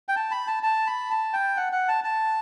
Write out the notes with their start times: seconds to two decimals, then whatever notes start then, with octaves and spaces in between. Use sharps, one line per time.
0.08 G5
0.16 A5
0.31 B5
0.47 A5
0.63 A5
0.87 B5
1.10 A5
1.33 G5
1.57 F#5
1.73 F#5
1.88 A5
2.04 A5